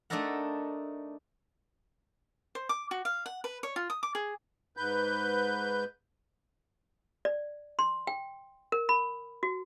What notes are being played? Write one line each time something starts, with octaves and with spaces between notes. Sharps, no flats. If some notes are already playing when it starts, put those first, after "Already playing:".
A3 D4 D#4 A4 A#4 F#5
C5
D6
F#4
F5
F#5
B4
C#5
F4
D#6
D6
G#4
G#2 B4 G6
D5
C6
G5
A#4
B5
F#4